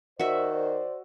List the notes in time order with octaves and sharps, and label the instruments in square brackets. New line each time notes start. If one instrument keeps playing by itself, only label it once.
[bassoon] D#3 [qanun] F#4 E5 [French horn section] C5 D5